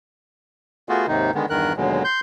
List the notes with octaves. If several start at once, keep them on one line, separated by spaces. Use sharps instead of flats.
A3 B3 F4 F#4 G#4
D#2 G#2 C3 D#3 D#4
D3 D#3 G#3 B3
E2 G2 D#3 A#4 F#6
D#2 B2 D3 F#3 G#3
C6 G6